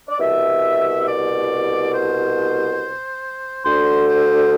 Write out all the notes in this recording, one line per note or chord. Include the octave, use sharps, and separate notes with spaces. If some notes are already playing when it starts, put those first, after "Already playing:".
D5
C2 B2 E5
D5
C5
D2 D3 C5
C5